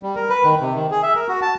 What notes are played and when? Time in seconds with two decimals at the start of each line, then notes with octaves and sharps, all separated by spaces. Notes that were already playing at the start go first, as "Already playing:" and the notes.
0.03 G3
0.16 A#4
0.30 B4
0.44 D#3
0.61 C3
0.74 D#3
0.91 G#4
1.03 E5
1.15 A#4
1.28 F#4
1.42 A5